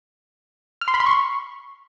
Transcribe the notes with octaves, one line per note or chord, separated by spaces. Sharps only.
F6
C6
B5
C6
C#6